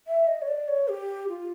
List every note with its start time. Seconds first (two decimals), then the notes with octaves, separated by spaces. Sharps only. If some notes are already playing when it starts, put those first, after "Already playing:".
0.07 E5
0.27 D#5
0.42 C#5
0.48 D5
0.68 C#5
0.88 G4
1.29 F4